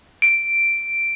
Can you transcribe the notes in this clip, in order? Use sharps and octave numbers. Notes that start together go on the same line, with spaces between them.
D7